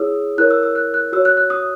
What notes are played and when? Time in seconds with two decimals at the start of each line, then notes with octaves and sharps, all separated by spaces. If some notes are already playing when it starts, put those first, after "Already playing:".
Already playing: E4 G#4 C#5 D#6 E6
0.38 E4 A#4 C#5 F#6
0.50 E6
0.63 E6
0.75 F#6
0.94 F#6
1.12 F#4 E6
1.17 C#5
1.25 F#6
1.37 F#6
1.50 D#6